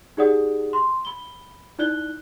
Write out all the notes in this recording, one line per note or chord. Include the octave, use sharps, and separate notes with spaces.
D#4 G4 G#4 D5 F#5 D#6
C6
B5 G7
D#4 E4 D5 F#6 G6 G7